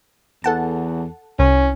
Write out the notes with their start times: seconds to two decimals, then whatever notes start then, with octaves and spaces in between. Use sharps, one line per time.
0.44 E2 A4 F#5 A5
1.39 C2 C#4